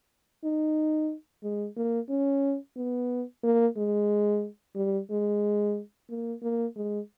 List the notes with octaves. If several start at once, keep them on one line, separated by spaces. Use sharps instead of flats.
D#4
G#3
A#3
C#4
B3
A#3
G#3
G3
G#3
A#3
A#3
G#3